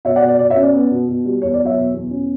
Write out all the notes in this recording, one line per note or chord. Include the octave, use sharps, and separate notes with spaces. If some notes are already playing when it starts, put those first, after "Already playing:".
B2 C#5 E5
D5 F#5
B2
D5
B2 D5
C#5 E5
C#4
D5
B3
B2
B2
G3
E2 C#5
D5
F#3
C#5 E5
B2
E2
C#4